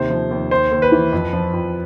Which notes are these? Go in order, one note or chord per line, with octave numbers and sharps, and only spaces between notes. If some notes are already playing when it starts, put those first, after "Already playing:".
Already playing: D#2 C3 C5
F3
D#2
D#2 C5
D#2
B4
E3
F2
F3
F2